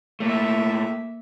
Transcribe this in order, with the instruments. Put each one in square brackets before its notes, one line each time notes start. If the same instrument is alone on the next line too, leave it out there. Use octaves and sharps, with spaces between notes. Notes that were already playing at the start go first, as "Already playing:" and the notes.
[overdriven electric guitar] A#2 A3 [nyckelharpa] A#3 E5